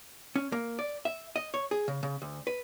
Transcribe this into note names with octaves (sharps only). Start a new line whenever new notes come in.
C#4
A#3
D5
E5
D#5
C#5
G#4
C#3
C#3
D2
B4